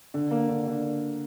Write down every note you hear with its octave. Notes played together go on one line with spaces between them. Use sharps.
D3
A#3
D3
D3